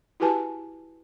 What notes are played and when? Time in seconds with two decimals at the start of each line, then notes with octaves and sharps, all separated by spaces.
0.20 E4 F#4 G4 B4 G#5 A5